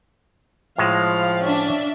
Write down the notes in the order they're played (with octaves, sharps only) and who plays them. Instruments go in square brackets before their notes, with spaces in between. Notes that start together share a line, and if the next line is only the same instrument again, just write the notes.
[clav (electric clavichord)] A2 G#3 [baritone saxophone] F3 [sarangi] F5
[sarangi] C#4 [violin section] D4 E5